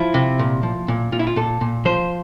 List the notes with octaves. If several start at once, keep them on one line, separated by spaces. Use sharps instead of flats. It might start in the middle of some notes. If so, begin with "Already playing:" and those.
Already playing: F3 E4
C3
A#2
F3
A#2
A#2 F4
E4
F4
A#2 A4
A#2
F3 C5